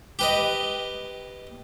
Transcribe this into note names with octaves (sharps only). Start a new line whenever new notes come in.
G4 B4 D#5